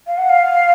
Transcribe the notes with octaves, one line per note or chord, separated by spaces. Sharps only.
F5
F#5
F5